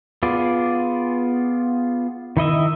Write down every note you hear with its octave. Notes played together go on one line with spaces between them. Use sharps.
B3 F4 G#4 D5
D#3 E4 D#5 E5